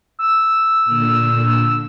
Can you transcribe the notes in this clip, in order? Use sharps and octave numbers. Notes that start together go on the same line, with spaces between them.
E6
A#2 D3